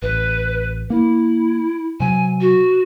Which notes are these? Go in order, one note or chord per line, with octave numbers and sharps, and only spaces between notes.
A1 B4
A#3 E4
C3 F#3 G#5
F#4